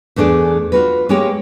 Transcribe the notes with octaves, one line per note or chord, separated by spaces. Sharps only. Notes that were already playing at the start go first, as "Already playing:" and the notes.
E2 A3 D4 G#4 D5
F4 F#4 B4
G#3 A#3 C#4 G4 G#4 C#5